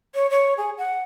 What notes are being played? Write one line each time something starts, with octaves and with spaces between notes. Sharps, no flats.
C#5
C#5
G#4
F#5